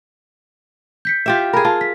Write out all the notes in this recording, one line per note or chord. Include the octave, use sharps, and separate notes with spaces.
G6 B6 C#7
F4 G4 E5
G#4 A#4 B5
F4 A5
B6